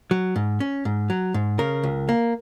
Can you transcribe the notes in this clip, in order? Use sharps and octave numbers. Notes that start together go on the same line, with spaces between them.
F#3
G#2
C#4
G#2
F#3
G#2
C#3 A#4
C#2
A#3